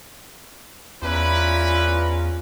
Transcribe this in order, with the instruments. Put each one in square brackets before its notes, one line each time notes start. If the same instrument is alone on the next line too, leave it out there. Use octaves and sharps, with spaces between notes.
[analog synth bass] E2 [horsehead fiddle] C#4 F4 [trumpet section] E4 B4 [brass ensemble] D5 A#5